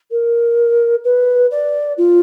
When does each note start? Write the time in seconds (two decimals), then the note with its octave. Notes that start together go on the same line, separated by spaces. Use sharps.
0.11 A#4
1.04 B4
1.51 D5
1.98 F4